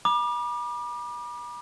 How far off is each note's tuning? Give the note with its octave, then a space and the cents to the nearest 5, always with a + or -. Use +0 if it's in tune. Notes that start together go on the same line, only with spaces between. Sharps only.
B5 -40 D6 +30